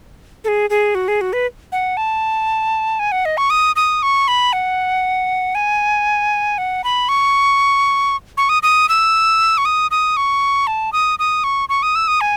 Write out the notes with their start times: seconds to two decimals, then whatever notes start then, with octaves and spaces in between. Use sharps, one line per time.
0.44 A4
0.48 G#4
0.70 G#4
0.95 F#4
1.08 G#4
1.21 F#4
1.33 B4
1.72 F#5
1.97 A5
2.99 G#5
3.12 F#5
3.25 D#5
3.37 C#6
3.50 D#6
3.76 D#6
4.03 C#6
4.28 B5
4.53 F#5
5.55 G#5
6.58 F#5
6.84 B5
7.09 C#6
8.37 C#6
8.49 D#6
8.63 D#6
8.89 E6
9.58 C#6
9.65 D#6
9.91 D#6
10.17 C#6
10.67 A5
10.93 D#6
11.19 D#6
11.44 C#6
11.69 C#6
11.83 D#6
11.95 E6
12.08 D#6
12.21 G#5